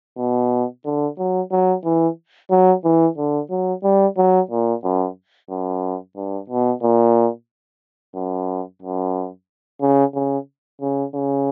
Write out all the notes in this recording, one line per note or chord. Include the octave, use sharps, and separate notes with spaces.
B2
D3
F#3
F#3
E3
F#3
E3
D3
F#3
G3
F#3
A#2
F#2
F#2
G2
B2
A#2
F#2
F#2
C#3
C#3
C#3
C#3